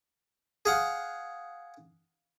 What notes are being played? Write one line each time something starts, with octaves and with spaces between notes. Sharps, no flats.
G#4 F5 F#5